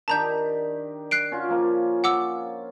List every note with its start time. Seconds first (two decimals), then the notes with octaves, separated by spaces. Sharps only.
0.08 D#3 D4 G4 A5 A#5 G6
1.11 F#6 C7 D7
1.32 C#4 F4 F#4
1.48 F3 A#3
2.04 F#5 D6 E6